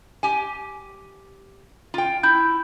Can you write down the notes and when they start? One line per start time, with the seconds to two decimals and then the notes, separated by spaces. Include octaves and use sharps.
0.23 G4 G#5
1.94 F4 G5
2.23 E4 G6